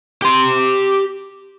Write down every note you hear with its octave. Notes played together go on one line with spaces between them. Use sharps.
G4 C6